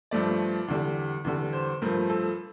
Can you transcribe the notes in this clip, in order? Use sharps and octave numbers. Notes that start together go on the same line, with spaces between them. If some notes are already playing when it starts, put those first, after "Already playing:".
G2 F3 A3 D5
E2 D3 G3
E2 D3 G3
C5
G2 F3 A3 A#4
A4